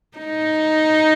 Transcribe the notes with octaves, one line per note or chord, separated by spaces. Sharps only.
D#4